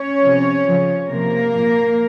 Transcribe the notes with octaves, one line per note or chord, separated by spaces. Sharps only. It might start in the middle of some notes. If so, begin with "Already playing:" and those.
Already playing: C#4 C#5
C3 F3
C#3 F3
C3 F3 A#3 A#4
A#2 F3